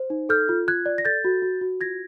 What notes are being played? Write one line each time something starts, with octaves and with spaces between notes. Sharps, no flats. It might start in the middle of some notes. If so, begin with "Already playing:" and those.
Already playing: C5
D#4
A4 F6 G6
F4
F4 F#6 G#6
D5
A#6
A4 G6 A6
F#4
F#4
F#4
F4 G#6 A#6